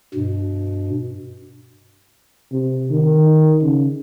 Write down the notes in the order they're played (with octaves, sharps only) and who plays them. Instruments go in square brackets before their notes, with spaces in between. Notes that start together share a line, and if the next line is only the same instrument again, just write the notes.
[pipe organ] G2 B2
[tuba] C3
D#3
C#3